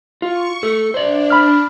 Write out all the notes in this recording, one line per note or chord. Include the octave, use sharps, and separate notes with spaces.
F4 C#6
A3 A4
D4 C5 D5
B5 F6